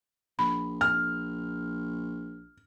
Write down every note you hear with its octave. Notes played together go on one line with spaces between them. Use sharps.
A#1 B5
F6